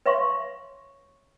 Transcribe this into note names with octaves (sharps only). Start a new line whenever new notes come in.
B4 C#5 E5 F5 C6 C#6